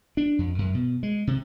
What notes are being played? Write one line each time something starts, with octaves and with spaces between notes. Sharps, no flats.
D4
F2
F#2
B2
G#3
C3